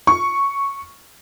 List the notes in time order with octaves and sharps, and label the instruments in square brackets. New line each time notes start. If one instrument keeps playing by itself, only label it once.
[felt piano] C#6